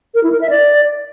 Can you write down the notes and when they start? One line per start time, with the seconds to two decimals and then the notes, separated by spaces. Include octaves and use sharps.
0.15 A#4
0.24 E4
0.32 A#4
0.41 E5
0.50 D5